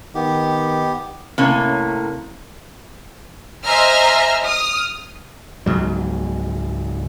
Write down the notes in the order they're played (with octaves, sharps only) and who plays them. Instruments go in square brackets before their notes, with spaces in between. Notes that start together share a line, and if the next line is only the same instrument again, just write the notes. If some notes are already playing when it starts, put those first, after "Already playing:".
[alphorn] D#3 [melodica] B3 G4
[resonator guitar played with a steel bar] A2 C3 A#3 C#4
[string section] C5 D#5 E5 G#5 A#5 F6
D#6 F6
[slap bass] C#2 G#2 F#3